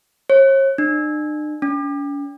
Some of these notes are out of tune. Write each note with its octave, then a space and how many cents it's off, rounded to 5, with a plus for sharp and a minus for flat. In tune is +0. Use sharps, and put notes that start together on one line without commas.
C#5 -40
D4 +45
C#4 +45